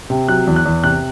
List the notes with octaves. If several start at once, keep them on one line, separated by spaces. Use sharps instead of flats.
C3
F#3 F#6
E2
F#6
E2
C3 F#6